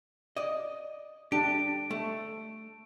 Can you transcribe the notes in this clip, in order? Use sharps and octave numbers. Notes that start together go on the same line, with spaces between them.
D5 D#5
D4 G4 D7
A3